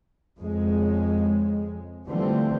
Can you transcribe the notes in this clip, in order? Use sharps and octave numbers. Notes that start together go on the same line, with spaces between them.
F2 C#3 G#3
D3 E3 F3 G3 A3 C4